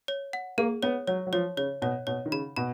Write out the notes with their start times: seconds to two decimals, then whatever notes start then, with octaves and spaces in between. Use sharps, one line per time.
0.08 C#5
0.33 F#5
0.58 A#3 G#4
0.83 B3 C#5
1.07 F#3 C#5
1.27 F#3
1.33 F3 C#5
1.57 C#3 C#5
1.82 B2 C#5
2.07 B2 C#5
2.26 D#3
2.32 C#3 B5
2.56 B2 B5